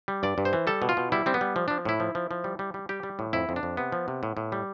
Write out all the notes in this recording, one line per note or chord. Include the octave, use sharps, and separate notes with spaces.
G3
G2 D5
G2
C5
E3
G3 A4
B2
F4
B2
G3 E4
G3 C4
B3
G3
F3
F3 D4
A2 E4
F3
F3
F3
G3
G3
G3
G3 G4
G3
A2
F2 E4
F2
D4
F2
C3 B3
F3
C3
A2
A2
G3